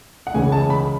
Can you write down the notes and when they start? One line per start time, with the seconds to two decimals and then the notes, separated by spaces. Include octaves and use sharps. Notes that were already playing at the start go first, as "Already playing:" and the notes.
0.27 F#5
0.34 C#2 C#3 E3 G#5
0.52 A5
0.70 B5